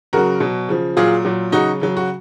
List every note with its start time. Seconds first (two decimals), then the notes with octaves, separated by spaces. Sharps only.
0.13 C#3 F#3 F#4 A#4
0.40 B2 F#3
0.69 C#3 F3
0.97 A#2 F#3 F4 G#4
1.25 A#2 F#3
1.52 C#3 F#3 D#4 F#4
1.81 C#3 F#3
1.97 F#4